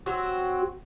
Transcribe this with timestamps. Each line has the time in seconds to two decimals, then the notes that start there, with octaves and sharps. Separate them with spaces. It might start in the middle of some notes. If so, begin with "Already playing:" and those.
0.06 F#3 C4 F#4